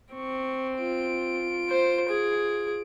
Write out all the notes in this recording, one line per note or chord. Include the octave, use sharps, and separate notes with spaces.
C4 C#6
F4 D7
C5
G#4